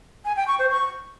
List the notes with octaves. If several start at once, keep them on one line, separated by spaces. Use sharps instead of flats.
G#5
G5
C#6
C5
C#6